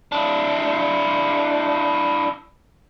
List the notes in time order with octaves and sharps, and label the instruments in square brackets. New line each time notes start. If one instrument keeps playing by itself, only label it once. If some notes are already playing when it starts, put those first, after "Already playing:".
[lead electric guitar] D4 E4